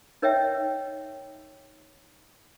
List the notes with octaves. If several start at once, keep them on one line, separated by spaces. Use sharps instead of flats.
D#4 A#4 C#5 D#5 E5 G5